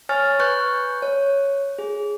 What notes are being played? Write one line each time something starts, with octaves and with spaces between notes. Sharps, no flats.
C#5 G#5 C#6 F6 A6
B4 C#6 F#6 G6
C#5
G#4